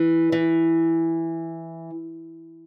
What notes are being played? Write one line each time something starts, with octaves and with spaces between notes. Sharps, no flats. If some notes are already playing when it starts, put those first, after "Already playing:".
Already playing: E3
E3